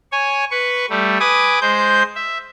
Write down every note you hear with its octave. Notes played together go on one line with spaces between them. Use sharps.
C#5 G#5
B4 C#6
G3 A3
B4 G#5 D6 D#6
G#3 C5 G6
E5